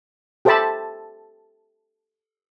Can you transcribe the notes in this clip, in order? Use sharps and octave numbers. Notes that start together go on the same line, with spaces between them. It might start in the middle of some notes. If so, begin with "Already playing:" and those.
G4 A4 C5 E5 A5 B5